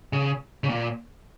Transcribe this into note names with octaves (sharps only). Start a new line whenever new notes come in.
C#3
C#3
A#2